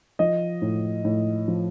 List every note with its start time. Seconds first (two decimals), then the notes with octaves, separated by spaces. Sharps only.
0.19 F3 D#5
0.62 A2
1.05 A2
1.48 F3